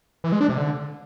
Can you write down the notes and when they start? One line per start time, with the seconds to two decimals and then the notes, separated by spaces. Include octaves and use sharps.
0.24 E3
0.32 G#3
0.41 D4
0.49 C3
0.57 D3